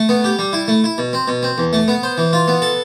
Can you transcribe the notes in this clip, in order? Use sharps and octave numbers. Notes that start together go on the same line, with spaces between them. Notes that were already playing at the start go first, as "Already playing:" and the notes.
Already playing: A3
B3
G4
G3
E4
A3
E4
B2
C4
B2
C4
E2
A3
B3
C5
E3
F4
B3
A4